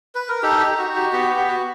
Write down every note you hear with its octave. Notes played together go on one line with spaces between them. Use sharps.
B4
A#4
D#4 G4 A4
G4
D#4
F#4
F#4
G4
B3 G4
G4
B3
F#4